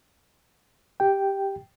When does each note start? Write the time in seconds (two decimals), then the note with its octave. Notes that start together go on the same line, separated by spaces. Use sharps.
1.00 G4 G5